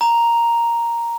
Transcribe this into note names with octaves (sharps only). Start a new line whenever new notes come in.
A#5